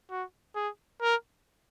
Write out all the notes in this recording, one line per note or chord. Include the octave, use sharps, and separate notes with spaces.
F#4
G#4
A#4